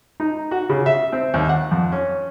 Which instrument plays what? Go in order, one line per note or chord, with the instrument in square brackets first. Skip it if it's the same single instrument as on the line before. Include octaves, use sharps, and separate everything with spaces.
[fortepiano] D#4
F#4
C#3
E5
C4
D#2
F#5
F2
C#4